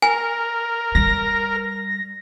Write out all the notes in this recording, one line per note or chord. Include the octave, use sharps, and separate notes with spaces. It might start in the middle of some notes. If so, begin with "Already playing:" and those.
A#4 G#5
G3 A#6